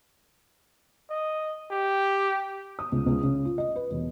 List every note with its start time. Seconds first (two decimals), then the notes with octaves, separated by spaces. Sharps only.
1.10 D#5
1.71 G4
2.79 D#6
2.92 C#2
3.06 C#2
3.23 C#3
3.45 F4
3.58 D#5
3.76 B4
3.91 E1